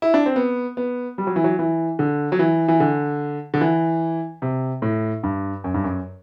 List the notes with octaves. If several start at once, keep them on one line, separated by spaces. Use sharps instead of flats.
E4
D4
C4
B3
B3
G3
F#3
E3
F#3
E3
D3
F#3
E3
E3
D3
D3
E3
C3
A2
G2
F#2
G2
F#2